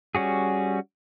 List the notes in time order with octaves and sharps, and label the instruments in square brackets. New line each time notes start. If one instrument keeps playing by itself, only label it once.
[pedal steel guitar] G3 C#4 F#4 G#4